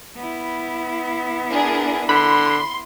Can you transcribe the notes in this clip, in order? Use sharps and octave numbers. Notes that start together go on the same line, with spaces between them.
B3 E4
D4 G#4 A#4
D3 B5 C6